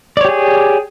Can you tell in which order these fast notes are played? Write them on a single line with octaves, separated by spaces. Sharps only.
D5 C#5 G4 G#4